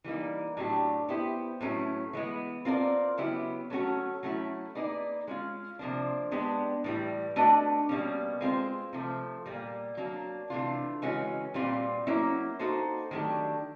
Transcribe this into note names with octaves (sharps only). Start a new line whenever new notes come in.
E3 G3 A#3 D#4
A2 F#3 A3 D4 G4
B3 E4 G4 C5
A2 F#3 A3 C#4 E4
E3 G#3 B3
C4 F4 A#4 D5
C#3 F#3 B3 E4 G4
F#3 A3 C#4 F#4 A4
F#3 A3 C#4 E4
A#3 D#4 G#4 B4 D5
G#3 C#4 F4
C3 F3 A#3 D4
G#3 B3 D4 G4
A2 E3 G3
A3 D4 F#4 B4 D#5
B2 G3 A#3 C#4
G#3 C4 F4 G#4 C5
C3 F3 A3
A#2 G3 A#3
F#3 A#3 D4
C3 E3 A3 D4 F4
C#3 E3 G#3 C#4 F#4
A#2 G3 C4 F4
F#3 A#3 C#4 E4
A#3 D#4 F#4 A4 C5
D#3 F#3 A3 D4 G4